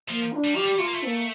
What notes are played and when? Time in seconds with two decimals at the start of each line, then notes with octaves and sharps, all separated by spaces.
0.09 F3 A#3
0.32 F4
0.36 D4
0.44 G3
0.54 F3 G4
0.64 G3
0.79 A3 F4
0.86 A#3
0.94 A3
1.02 C4
1.06 A#3